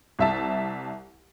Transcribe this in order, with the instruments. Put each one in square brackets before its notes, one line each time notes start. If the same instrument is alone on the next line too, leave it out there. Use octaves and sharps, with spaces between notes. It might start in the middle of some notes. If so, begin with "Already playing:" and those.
[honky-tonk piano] C2 E5 A5